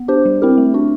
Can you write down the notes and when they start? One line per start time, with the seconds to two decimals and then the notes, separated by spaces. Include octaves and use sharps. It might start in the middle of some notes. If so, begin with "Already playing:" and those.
Already playing: B3
0.08 D4 G4 C5
0.25 G3
0.42 C4 E4 G4 A#4
0.58 A3
0.74 D4 F#4